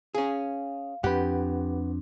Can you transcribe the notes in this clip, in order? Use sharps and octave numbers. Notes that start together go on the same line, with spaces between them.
C#4 G#4 F5
F2 C4 D4 G4 B4 F#5